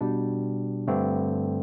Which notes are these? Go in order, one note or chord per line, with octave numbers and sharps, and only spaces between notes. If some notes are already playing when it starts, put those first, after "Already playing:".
B2 G3 D4
G2 D3 A3 C4